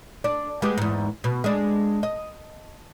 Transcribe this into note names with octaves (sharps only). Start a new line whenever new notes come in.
D4
G#3 B3 G4
E2 G#2
B2
G#3 D4
D#5